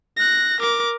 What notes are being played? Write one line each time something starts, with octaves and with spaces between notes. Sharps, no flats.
F#6 A#6
A#4 D6